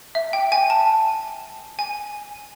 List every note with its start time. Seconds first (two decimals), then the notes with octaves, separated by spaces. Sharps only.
0.15 E5
0.33 G5
0.52 G#5
0.70 A5
1.79 G#5